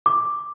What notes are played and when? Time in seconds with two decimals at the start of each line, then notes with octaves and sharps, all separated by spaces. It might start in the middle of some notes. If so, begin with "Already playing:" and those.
0.06 D6